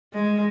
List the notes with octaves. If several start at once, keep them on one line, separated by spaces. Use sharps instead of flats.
G#3